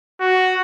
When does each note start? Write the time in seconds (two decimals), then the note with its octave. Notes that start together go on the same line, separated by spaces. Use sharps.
0.21 F#4